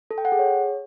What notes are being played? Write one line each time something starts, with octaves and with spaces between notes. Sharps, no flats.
A4
G5
F#5
G#4
C#5